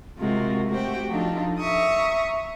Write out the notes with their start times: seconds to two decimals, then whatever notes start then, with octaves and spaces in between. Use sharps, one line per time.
0.19 C3 G#3 F4 F#4 A#4
0.70 A3 F#4 G4 C5 G5
1.09 F3 D4 D#4 F4 A4
1.59 E5 A#5 C#6 D#6